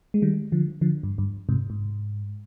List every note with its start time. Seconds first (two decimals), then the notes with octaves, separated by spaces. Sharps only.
0.14 G#3
0.22 D#3 G3
0.52 D3 F3
0.81 D3 F3
1.03 G2
1.18 G2
1.49 G#2 C3
1.70 G#2